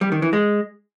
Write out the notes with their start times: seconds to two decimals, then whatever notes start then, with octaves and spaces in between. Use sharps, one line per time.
0.01 G3
0.12 D#3
0.22 E3
0.33 G#3